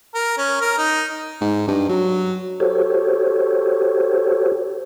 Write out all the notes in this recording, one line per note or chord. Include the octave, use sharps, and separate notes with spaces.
A#4
C#4
A#4
D#4
G#2
G2
F#3
F#4 G4 A4 C5 C#5